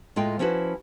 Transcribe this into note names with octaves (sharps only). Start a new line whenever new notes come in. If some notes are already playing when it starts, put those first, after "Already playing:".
A2 G#3 F4 G5
F3 C#4 E4 F#4 B4